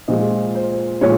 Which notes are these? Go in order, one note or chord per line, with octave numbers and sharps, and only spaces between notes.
A#2 F3 G#3 D#5
C5
A#2 F3 G#3 C#5